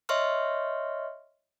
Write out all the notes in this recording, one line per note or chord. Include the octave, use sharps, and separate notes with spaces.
C#5 D#5 E5 C6 C#6 F6